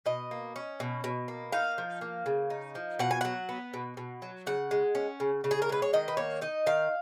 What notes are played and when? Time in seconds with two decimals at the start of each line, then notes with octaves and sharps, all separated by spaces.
0.06 B2 D#5
0.31 A#3
0.56 C#4
0.80 B2
1.04 B2
1.28 A#3
1.52 D#4 F5
1.78 F3
2.01 A#3
2.26 C#3
2.50 D#4
2.75 F3
2.99 B2 F#5
3.11 G#5
3.21 F#3 F#5
3.49 B3
3.74 B2
3.97 B2
4.22 F#3
4.46 C#3 F#5
4.71 G#3
4.95 C#4
5.20 C#3
5.44 C#3
5.51 G#4
5.62 A#4
5.69 G#3 B4
5.82 C#5
5.93 D#3 D#5
6.08 B4
6.17 A#3 C#5
6.41 D#4 D#5
6.66 D#3 F5